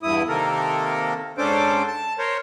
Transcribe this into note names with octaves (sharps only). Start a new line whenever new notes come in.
E2 G2 E4 D#6
C3 D#3 A#3 A4 A#4
G#2 C#4 D4 A4 C5 D6
A5
A#4 C5 C#5